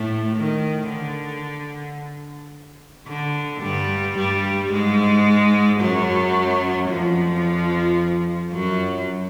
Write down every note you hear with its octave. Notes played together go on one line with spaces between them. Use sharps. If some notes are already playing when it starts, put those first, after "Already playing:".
Already playing: A2 A3
D#3
D3
D3
G2 G3
G2 G3
G#2 G#3
F#2 F#3
F2 F3
F#2 F#3